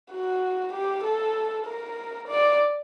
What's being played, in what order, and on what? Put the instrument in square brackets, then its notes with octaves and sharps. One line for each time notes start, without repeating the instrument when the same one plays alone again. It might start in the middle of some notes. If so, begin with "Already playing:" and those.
[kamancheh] F#4
G4
A4
A#4
D5